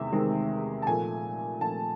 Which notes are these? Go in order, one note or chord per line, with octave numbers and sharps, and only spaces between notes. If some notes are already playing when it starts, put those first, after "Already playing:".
Already playing: E2 C3 D#3 G#3 E5
E2 C3 D#3 G#3 C4
A5
A#2 F3 A3 G#5
A#2 F3 A3 A5